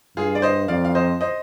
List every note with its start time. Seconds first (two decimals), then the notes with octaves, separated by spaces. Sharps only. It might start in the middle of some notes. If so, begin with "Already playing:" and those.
0.17 G2 F4 G#4
0.35 D5
0.42 C5 D#5
0.68 F2 D5 F5
0.85 F5
0.95 C5 D#5
1.21 C5 D#5